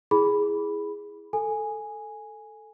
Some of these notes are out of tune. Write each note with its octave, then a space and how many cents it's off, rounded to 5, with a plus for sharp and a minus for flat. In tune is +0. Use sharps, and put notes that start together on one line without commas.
E4 +0 G#4 +0 B5 +0
A4 +0 G#5 +0